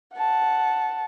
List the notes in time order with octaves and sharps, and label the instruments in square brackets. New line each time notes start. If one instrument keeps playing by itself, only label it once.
[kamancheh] F#5 A5